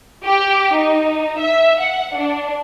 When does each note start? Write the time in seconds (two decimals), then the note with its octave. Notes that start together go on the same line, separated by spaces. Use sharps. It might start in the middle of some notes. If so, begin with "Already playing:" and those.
0.24 G4
0.76 D#4
1.38 E5
1.81 F#5
2.16 D4